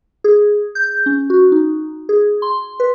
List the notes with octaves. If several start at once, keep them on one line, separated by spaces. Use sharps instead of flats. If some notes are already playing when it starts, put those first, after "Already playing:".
G#4
G6
C#4
F#4
D#4
G#4
C6
B4